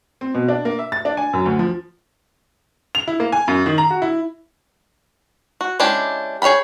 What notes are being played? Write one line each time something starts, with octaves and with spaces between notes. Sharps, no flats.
C4
B2
D4
A#3
E5
A6
D4
G#5
F#2
D2
F3
F7
E4
A#3
G#5
F#2
D#3
A#5
F#4
E4
F#4
G#3 C#4 D4 E4 G4
G#4 C#5 F5 G5 B5